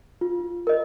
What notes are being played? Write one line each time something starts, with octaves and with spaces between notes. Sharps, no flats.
F4
A#4 D#5